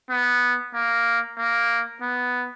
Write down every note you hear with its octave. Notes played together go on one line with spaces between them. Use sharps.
B3
A#3
A#3
B3